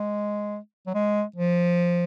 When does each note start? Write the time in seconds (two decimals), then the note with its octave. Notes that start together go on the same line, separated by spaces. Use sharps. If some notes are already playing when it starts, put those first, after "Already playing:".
Already playing: G#3
0.87 F#3
0.94 G#3
1.36 F3